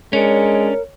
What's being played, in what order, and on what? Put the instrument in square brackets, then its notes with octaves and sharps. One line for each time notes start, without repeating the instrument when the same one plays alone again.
[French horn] G#3 [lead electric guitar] C#4 D4 [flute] A#4 [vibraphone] C#5